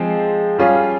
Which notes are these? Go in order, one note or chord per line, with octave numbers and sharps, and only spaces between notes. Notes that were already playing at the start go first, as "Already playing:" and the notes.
Already playing: F3 G#3 C4
G3 C#4 F4 G#4